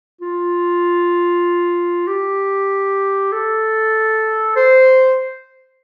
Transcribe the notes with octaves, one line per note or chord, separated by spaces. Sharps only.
F4
G4
A4
C5